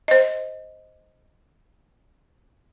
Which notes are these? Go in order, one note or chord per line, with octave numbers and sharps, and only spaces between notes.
C5 D#5